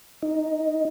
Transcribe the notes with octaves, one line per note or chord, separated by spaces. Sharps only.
D#4